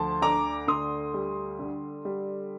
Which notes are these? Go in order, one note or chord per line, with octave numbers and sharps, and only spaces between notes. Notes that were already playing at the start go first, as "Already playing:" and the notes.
Already playing: D2 F3 A5 C6
D3 A#5 D6
D2 C6 D#6
G3
D3
G3